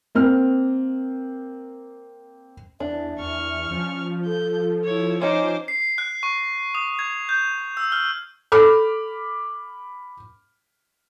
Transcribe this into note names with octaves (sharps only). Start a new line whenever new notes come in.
A#3 C4 F6
E2 D4 E5
E2 C#6 F6
F3 C#4
A4 G6
E4 C#5
C#4 D#4 C5 D6
C7
F#6
C#6
D#6
G#6
G6
E6
F6
A4 B5 D6 F6